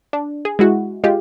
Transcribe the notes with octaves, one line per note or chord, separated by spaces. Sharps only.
D4
G#4
G#3 E4 F#4
G#3 F4 G4